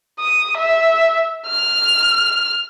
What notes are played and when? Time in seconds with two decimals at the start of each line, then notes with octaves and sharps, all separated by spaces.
0.20 D#6
0.58 E5
1.47 F6